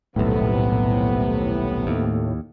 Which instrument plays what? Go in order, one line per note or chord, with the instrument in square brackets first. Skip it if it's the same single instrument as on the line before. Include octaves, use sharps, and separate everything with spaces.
[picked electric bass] D#1 B1 [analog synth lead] A2 [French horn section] C3 B3
[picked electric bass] D#2